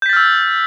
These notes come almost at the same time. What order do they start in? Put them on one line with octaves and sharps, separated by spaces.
G6 B6 A6 F6 E6